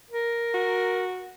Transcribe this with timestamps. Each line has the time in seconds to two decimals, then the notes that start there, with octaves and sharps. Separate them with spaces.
0.11 A#4
0.54 F#4